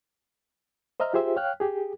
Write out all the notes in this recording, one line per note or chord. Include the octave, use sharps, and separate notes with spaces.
C5 D#5 E5 A#5 F6
F4 G4 G#4 C5 E5
C#5 F5 G5 F6 F#6
G4 G#4